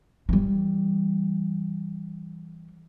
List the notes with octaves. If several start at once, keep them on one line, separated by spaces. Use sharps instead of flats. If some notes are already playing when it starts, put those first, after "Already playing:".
E3 G3